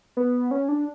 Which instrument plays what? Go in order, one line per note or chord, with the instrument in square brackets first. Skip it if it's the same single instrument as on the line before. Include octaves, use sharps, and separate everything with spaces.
[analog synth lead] B3
C#4
D4